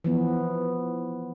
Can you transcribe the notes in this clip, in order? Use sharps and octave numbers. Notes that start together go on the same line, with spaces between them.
E3 F3 B3